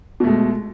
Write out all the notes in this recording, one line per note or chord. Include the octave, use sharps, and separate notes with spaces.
B2 G#3 A3